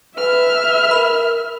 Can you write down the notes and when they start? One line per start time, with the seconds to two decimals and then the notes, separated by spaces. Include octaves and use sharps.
0.17 B4 E5 F6
0.91 A#4 B5 F7